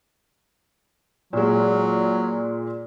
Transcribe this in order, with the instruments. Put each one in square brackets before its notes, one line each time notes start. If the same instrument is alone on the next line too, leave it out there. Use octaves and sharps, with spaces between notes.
[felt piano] A#2 G#3 [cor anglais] F#3